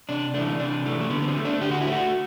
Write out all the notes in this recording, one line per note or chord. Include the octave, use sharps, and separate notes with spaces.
C3 D4
E3 A3 D4
C3 D4
E3 A3
A3
D3 B3
B3
C4
A3
D4
D3 G4
F#4
E4
A3
F#4